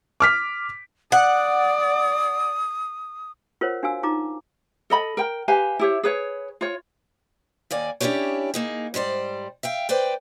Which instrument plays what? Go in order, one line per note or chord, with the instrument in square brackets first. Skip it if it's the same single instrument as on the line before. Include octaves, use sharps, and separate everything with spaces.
[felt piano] D6 F6 B6
[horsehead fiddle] D5 [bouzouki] F#5 [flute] D#6
[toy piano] F4 A#4 C5 C#5 F#5
D4 F#4 F5 G#5 E6
D#4 F4 A#5 D6
[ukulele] A4 D#5 B5
A#4 G5
G4 B4 F5 G#5
E4 G4 C#5
G#4 B4 C#5
F4 C#5
[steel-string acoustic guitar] D#2 A#3 D5 G#5
C#4 D4 E4 F4 G4 C#5
A#3 D#4 G#4
G#2 G3 C5 D5
E5 F5 G5
B4 C5 D5 G5